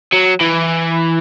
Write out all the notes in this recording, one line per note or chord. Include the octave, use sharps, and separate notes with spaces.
F#3
E3